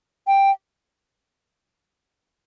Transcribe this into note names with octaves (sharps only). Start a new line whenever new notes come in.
G5